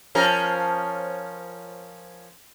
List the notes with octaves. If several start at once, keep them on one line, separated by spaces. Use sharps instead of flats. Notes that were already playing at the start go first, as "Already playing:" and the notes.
F3 C#4 A#4